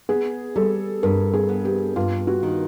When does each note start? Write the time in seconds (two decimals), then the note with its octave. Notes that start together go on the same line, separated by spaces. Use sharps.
0.09 B3 G#4
0.56 G3 A4
1.03 G2 A#4
1.34 G#4
1.49 B3
1.65 G4
1.96 G2 F4
2.27 F#4
2.43 D#3